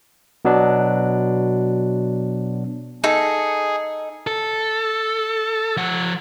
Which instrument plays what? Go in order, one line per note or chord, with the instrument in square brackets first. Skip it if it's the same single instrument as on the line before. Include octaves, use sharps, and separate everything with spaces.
[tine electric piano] B2 F#3 B3 D4
[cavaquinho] D#4 A4 [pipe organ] G#4
[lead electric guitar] A4
F3 F#5